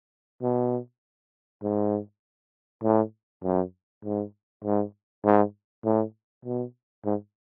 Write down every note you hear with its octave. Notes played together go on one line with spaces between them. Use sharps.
B2
G#2
A2
F#2
G#2
G#2
G#2
A2
B2
G#2